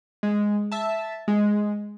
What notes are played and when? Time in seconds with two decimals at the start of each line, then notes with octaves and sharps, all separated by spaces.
0.23 G#3
0.72 E5 A5
1.28 G#3